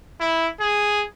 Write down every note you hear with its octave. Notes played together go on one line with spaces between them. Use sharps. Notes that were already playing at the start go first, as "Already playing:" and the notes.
E4
G#4